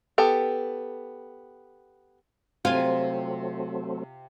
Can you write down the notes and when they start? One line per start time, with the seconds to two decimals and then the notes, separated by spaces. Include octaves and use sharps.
0.18 B3 G4 A4
2.65 C3 F#3 A3 C4 F4 G#5